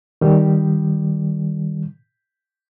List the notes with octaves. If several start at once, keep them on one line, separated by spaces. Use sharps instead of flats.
D#3 G3